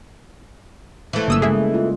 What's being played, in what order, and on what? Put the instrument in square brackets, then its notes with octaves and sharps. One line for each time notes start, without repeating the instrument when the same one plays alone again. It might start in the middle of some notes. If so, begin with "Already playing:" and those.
[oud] E3 A3
[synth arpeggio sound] G1 D#6 E6 [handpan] A#3
[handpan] C#3 G3 G#3 [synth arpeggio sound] G#4 E5
[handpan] F4